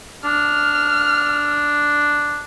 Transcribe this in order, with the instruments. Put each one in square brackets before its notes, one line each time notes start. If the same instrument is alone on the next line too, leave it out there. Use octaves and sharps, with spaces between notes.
[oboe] D4 [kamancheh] F6